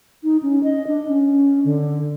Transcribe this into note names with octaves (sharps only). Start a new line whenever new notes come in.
D#4
C#4
D#5
D4
C#4
D3